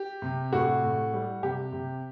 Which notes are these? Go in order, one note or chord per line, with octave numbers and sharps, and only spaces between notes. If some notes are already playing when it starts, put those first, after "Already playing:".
Already playing: G4
C3
A2 F#4
A2
G3
C3 G4
C3